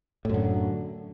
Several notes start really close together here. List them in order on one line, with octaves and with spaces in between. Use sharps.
A2 F#2 D3